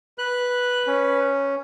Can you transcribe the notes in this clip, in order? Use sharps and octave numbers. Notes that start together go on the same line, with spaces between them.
B4 F#6
C#4